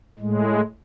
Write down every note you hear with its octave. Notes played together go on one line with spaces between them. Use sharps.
A2 G#3